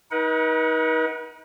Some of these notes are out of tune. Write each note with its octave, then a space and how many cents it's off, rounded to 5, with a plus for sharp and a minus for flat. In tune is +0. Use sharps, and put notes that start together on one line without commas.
D#4 +30 B4 -45 F#5 +0